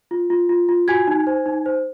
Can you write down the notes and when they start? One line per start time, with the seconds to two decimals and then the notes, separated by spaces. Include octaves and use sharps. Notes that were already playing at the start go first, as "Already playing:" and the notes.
0.11 F4
0.30 F4
0.49 F4
0.69 F4
0.88 F#4 G#5 G#6
1.08 D#4
1.27 C5
1.46 D#4
1.66 C5